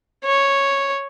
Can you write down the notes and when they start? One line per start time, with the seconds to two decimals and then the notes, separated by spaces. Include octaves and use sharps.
0.24 C#5